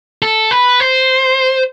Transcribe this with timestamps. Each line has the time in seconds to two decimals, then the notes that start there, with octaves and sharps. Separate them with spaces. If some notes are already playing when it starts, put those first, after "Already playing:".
0.22 A4
0.51 B4
0.80 C5